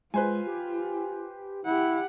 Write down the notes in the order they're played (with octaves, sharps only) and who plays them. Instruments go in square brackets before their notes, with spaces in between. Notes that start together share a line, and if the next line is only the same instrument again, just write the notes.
[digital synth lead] G#3 [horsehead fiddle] F4 [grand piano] B4 C5 G#5
[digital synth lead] G4
[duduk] E4 [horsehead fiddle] G4 F#5